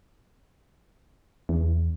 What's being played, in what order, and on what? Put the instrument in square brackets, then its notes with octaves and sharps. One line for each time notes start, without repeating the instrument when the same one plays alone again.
[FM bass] E2